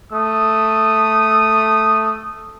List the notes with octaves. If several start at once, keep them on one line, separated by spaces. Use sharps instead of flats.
A3 D#6